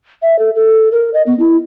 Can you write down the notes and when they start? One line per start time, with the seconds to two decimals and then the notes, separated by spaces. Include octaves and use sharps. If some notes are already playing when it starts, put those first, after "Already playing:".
0.22 E5
0.39 A4
0.55 A4
0.92 A#4
1.14 D#5
1.26 B3
1.39 E4